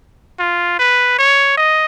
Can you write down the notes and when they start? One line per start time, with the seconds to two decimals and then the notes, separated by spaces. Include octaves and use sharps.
0.39 F4
0.79 B4
1.19 C#5
1.57 D#5